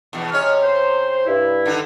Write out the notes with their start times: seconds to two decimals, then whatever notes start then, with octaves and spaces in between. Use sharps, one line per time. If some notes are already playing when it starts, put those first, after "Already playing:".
0.13 E2 B2
0.32 C3 G#3 C#4 C#5 F6
0.63 C5
1.26 G2 E4
1.66 D3 D#3 D#4